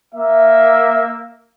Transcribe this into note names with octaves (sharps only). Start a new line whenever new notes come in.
A#3 E5